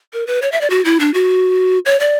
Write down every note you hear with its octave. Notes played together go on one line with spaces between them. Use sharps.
A#4
B4
C#5
E5
D5
F#4
E4
D4
F#4
C#5
D5